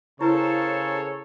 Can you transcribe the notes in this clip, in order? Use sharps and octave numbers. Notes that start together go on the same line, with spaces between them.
C#3 E4 A4 A#4 C5 C#5 A5